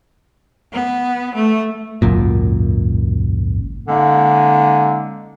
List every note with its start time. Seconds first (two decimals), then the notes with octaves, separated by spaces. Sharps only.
0.73 B3
1.35 A3
2.02 G#1 C#2 F#2 A#2
3.87 D3 G#3 A#3 C#4 D#4